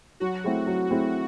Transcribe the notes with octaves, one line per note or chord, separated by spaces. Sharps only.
F#3 F#4
A3 C4 E4 G#4
F#3
A3 C4 E4 G#4